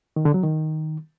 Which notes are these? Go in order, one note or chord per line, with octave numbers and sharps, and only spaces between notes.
D#3
D3
F#3
D#3